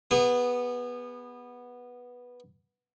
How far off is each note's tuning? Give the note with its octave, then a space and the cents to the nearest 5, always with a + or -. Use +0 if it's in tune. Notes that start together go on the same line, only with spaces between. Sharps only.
B3 -5 G#4 -35